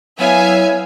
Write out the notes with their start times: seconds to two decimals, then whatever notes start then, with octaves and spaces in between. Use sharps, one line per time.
0.19 F#3 B3 E4 C#5 E5 F5 G#5